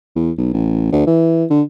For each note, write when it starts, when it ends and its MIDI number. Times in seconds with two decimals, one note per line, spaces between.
0.16 0.31 40
0.38 0.51 35
0.53 0.89 33
0.92 1.06 38
1.07 1.45 52
1.50 1.62 50